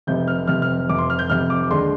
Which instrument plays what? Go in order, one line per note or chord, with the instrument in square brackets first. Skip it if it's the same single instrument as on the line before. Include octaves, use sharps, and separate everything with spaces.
[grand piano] F1 F2 C3 G6
F6
F1 F2 C3 F6
F6
F1 F2 C3 D6
C6
F6
G6
F1 F2 C3 F6
D6
D#2 D3 G#3 D4 C6